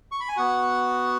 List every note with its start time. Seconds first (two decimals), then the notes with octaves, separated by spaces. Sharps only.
0.12 C#6
0.20 B5
0.29 G#5
0.36 B3 F#4 F#5